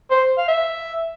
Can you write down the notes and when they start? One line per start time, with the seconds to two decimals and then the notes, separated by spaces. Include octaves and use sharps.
0.11 C5
0.38 F5
0.48 E5